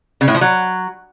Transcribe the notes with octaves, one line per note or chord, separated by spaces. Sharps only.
C#3
A2
F3
F#3